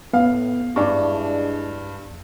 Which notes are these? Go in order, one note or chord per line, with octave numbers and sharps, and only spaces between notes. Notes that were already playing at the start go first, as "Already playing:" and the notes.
A2 B3 F5
G2 G#3 D4 E4 D5 C#6